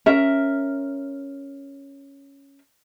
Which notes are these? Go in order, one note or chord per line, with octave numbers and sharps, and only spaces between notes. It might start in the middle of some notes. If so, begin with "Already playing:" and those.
C#4 A#4 E5